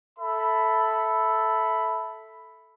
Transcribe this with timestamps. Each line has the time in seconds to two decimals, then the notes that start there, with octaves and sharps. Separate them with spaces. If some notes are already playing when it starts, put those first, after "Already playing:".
0.19 A4 E5 B5